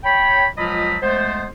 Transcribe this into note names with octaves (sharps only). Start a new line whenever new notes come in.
C#5 G5 B5
C#2 F3 F#3 F4 D#5 B5
G#3 A3 B3 C5